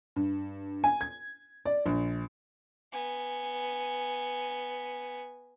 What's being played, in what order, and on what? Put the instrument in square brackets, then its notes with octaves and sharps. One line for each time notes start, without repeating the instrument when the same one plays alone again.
[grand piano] G2
G#5
G#6
D5
A#1
[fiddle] B3 G#5